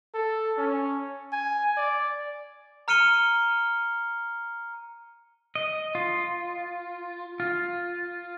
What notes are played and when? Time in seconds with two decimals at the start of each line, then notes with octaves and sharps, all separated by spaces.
0.15 A4
0.58 C#4
1.32 G#5
1.77 D5
2.88 A#5 F6 C#7 D#7 G7
5.55 D#5
5.95 F4
7.40 F4